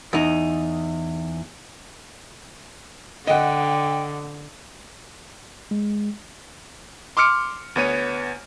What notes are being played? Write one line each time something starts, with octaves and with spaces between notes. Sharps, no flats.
E2 D#4
D3 D#5 F#5 G5
G#3
C6 D6 E6 F6 C#7 D7
D2 B3 C#5 D#7